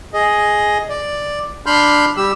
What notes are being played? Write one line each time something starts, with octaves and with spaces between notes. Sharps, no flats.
G#4 D#5
D5
D4 B5 C6 F6 G6
G3 G4 E6